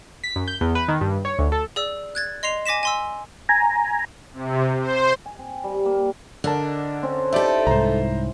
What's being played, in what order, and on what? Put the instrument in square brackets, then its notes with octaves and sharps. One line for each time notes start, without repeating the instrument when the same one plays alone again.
[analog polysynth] B6
F#2
G6
E2
B4
D#3
G2
C#5
D2
A4
[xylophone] G#4 D5 E6
F#6 G#6 A6
D#5 C6 C7 F7
G#5 D6 A#6 B6 E7
G#5 C6 E6
[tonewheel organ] G#5 A#5
[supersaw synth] C3
C5
[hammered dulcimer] G#5
C4
G3
A#3
[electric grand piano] D3 A#4 A5 [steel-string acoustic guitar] D4 [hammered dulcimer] D#5 F#5
[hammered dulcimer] C4 C#4 C5
[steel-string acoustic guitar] D#4 A4 [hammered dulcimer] E4 D6 [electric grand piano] G4 D5 E5
[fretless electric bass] C2 G#2 [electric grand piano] C5 A#5